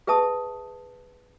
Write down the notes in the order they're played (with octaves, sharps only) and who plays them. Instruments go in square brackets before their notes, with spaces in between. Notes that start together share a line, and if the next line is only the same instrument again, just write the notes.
[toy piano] G#4 B4 E5 A5 D#6